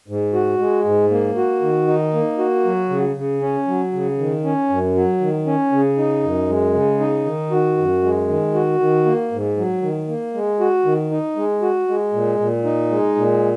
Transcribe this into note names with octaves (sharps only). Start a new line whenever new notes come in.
G#2
F#4
G#3
G#2
A#3
F#4
D#3
D#4
A#3
F#4
F#3
C#3
C#3
C#4
F#3
C#3
D#3
C#4
F#2
F#3
D#3
C#4
C#3
D#4
F#2
G#3
C#3
D#4
D#3
F#4
F#2
G#3
D#3
F#4
D#3
A#3
G#2
F#3
D#3
A#3
G#3
F#4
D#3
D#4
G#3
F#4
G#3
A#2
A#2
D#4
G#3
A#2